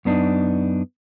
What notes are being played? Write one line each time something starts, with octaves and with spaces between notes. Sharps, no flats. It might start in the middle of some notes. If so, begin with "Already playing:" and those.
F#2 B3 D4 D#4